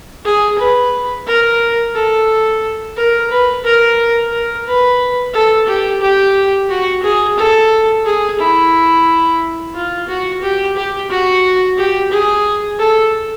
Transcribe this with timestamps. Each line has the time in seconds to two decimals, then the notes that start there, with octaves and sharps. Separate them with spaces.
0.25 G#4
0.59 B4
1.26 A#4
1.95 A4
2.97 A#4
3.30 B4
3.64 A#4
4.32 A#4
4.67 B4
5.34 A4
5.67 G4
6.01 G4
6.69 F#4
7.03 G#4
7.38 A4
8.06 G#4
8.39 E4
9.74 F4
10.09 F#4
10.42 G4
10.76 G4
11.10 F#4
11.77 G4
12.11 G#4
12.79 A4